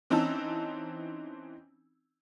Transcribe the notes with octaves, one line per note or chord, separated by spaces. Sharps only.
E3 C4 C#4 D#4 A5 E6